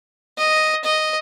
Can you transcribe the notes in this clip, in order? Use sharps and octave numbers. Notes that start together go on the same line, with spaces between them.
D#5
D#5